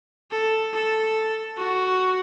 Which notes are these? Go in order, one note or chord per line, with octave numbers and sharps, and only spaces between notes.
A4
A4
F#4